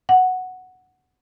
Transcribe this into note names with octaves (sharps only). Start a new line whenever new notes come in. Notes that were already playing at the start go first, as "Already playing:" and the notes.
F#5